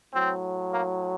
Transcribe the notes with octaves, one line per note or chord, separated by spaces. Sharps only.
A2 F#3 C4
A#3